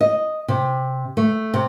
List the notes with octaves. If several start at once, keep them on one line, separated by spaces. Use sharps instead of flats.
D#5
C3
A3
C3